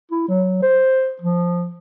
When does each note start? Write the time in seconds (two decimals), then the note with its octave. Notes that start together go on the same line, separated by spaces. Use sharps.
0.12 E4
0.28 F#3
0.62 C5
1.22 F3